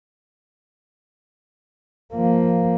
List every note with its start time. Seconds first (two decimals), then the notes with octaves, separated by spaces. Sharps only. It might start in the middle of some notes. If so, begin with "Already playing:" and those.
2.14 F3 A#3